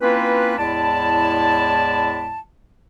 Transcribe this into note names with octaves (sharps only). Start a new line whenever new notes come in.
A#3 C4 C#4 E4 F4 B4
E2 A2 G#3 E4 D5 A5